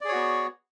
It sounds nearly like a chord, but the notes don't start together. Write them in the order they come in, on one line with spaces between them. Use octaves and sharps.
D5 G#4 C#5 F#4 B3